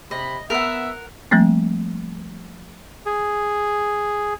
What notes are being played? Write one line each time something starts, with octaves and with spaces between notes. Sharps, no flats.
C3 D#5 B5
B3 A#4 E5 F#5
F3 G3 A3 A#3 C4
G#4